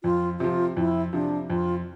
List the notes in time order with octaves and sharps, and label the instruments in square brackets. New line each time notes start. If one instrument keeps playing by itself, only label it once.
[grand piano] F2 [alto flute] F4
[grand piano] C3 F3 [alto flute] F4
[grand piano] F2 [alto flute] E4
[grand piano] C3 F3 [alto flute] D4
[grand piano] F2 [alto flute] F4